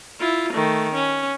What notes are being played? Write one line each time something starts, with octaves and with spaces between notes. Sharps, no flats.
E4 F4
D#3 A3
C#4